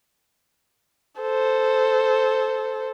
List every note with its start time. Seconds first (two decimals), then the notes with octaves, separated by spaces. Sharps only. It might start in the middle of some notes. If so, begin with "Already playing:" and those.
1.21 A4 C5